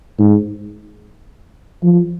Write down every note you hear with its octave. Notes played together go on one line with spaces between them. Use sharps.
G#2
F3